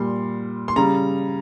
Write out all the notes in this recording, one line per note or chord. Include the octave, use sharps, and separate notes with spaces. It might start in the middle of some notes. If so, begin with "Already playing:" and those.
Already playing: A#2 G3 C6
C6
C#3 G3 A#5